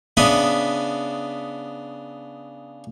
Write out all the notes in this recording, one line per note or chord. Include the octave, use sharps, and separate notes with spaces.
C#3 B3 D4 D#5 E5 B5